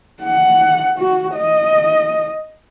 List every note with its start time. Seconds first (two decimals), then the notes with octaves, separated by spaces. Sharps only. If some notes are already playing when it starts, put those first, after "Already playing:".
0.22 F#5
0.98 F#4
1.35 D#5